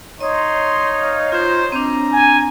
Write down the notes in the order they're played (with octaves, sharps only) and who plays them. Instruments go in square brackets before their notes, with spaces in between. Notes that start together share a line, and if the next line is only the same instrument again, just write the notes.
[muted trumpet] D#4 [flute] C#5 [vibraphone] D#5 D#6 [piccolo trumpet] C6
[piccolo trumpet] F5
[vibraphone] F4 [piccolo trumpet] C5
[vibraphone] C4 D4 [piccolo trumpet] A#5
[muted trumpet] G#5